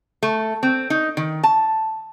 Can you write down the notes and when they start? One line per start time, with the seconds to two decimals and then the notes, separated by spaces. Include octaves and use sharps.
0.23 A3
0.63 C4
0.90 D#4
1.17 D#3
1.43 A5